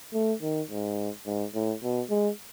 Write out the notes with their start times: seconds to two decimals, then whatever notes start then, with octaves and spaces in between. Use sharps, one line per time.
0.13 A3
0.42 D#3
0.71 G#2
1.26 G#2
1.55 A2
1.83 B2
2.10 G#3